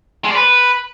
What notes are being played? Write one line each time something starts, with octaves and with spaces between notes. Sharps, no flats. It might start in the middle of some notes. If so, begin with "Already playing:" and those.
G#3
D5
B4